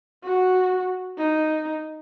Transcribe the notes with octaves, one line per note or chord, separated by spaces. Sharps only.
F#4
D#4